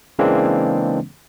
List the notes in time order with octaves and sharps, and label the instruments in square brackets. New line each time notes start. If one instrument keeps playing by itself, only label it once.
[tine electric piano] C#3 E3 G#3 A#3 C4 D4